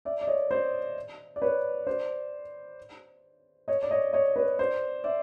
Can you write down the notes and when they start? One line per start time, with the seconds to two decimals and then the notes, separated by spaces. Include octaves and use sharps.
0.05 D5 E5
0.21 D5
0.27 C#5 D#5
0.51 C5 D5
1.36 D5
1.42 B4 C#5
1.87 C5 D5
3.68 C#5 D#5
3.83 D5
3.91 C#5 D#5
4.13 C#5 D#5
4.36 B4 C#5
4.59 C5 D5
5.04 D5 E5